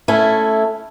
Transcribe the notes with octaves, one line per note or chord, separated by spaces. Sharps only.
A3 C#4 E4